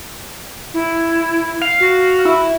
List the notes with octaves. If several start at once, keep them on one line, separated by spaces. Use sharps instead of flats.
E4
F5
F#4
E4